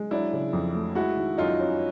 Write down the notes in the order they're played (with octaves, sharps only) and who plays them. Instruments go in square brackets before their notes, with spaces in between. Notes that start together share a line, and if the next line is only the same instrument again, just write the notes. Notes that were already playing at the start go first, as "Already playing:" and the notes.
Already playing: [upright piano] G#3
[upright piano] F#3 [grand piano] D4 E4
[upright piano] C#3
F2
A3
[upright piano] G#3 [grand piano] E4 F#4
[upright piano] D#3
[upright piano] F#2 [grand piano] D#4 F4
[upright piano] C#4